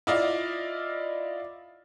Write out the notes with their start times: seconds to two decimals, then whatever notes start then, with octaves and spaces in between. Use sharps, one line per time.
0.07 E4 F4 D5 D#5 F5